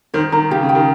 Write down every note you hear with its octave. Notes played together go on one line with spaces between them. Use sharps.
D#3 C5
D#3 A#5
C#3 G4
C#3
G5
D#3